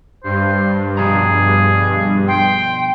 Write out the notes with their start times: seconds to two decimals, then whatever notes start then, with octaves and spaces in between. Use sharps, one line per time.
0.24 G2 C5
0.97 B2 F3 G#4 A#5
2.28 G5 C6